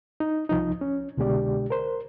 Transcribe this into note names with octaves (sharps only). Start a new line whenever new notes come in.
D#4
C2 F3 D#4
C#4
C2 B2 D3 G#3 G4 D5
A#4 C5